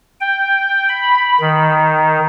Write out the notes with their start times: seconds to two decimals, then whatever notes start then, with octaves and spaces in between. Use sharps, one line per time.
0.21 G5
0.89 B5
1.40 D#3